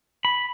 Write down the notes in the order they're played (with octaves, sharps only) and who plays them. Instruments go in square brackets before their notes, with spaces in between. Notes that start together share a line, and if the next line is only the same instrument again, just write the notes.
[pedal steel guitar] B5